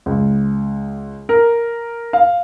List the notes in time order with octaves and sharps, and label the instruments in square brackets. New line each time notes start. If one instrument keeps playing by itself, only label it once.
[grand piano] C#2
A#4
F5